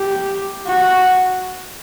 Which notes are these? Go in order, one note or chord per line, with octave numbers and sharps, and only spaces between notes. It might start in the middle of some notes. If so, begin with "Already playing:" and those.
Already playing: G4
F#4